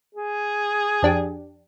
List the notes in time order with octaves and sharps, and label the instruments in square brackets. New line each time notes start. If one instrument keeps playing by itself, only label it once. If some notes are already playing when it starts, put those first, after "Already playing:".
[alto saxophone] G#4
[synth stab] F2 D4 G4